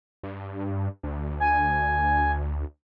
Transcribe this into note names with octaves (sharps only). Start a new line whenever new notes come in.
G2
D2
G#5